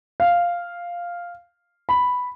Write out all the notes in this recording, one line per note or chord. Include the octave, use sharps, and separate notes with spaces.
F5
B5